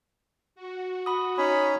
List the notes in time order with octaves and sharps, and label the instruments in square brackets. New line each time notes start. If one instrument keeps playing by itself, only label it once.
[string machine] F#4
[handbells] B5 D#6
[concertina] C#4 D#4 C#5 [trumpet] B5 [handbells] D#6